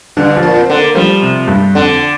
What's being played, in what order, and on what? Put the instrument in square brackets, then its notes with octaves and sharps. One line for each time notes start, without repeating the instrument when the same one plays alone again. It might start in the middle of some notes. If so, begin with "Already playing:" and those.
[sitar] G2 [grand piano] D3
[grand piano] F3
[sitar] A#2
[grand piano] C4
[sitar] D3
[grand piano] A#3
[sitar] F3 [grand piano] G3
[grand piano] C3
G2
[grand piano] F2 [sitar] D3